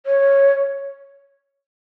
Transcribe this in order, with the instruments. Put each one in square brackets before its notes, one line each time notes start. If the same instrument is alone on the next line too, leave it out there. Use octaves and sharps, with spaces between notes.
[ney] C#5